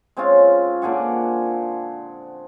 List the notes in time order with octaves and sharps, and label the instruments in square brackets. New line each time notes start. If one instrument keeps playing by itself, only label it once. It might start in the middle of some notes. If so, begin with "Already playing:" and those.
[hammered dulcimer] G#3 C4 C#4 F4
A#2 D3 G#4 F#5